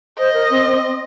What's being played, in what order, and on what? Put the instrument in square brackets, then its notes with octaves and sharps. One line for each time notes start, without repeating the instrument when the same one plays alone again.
[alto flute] C5 [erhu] D#5
[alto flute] A#4
C4
C4
C4